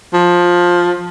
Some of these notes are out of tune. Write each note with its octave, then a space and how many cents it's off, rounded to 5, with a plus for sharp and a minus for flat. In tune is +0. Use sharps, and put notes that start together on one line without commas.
F3 +10